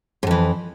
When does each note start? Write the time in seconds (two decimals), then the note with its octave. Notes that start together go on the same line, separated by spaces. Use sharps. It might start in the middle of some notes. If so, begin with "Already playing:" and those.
0.23 G#2
0.27 F2
0.31 E3